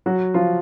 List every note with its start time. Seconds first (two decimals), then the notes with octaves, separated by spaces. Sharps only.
0.06 F#3 F#4
0.34 F3 F4